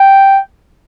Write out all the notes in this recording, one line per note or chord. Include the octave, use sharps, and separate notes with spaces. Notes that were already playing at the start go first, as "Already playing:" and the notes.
Already playing: G5